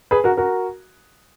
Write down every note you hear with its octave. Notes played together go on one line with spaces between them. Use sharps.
G#4 B4
F#4 A#4
F#4 A#4